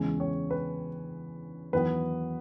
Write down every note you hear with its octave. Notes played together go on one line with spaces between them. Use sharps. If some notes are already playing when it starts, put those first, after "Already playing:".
Already playing: E2 C#3 G#3 C#4
C#5
B4
E2 D#3 F#3 B3 B4